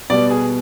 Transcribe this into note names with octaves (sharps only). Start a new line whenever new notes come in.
B2 G3 B3 D5
G#4